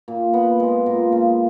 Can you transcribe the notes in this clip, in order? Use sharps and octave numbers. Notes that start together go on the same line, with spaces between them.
A#2
B3
G#3
A#2
C#3